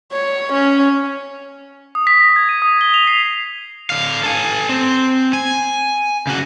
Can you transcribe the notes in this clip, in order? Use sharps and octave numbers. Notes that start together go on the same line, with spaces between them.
C#5
C#4
D#6
B6
A#6
G#6
D#7
D#6
G7
F7
C7
D3 F5
A4 G#5
C4
G#5
C#3 F#4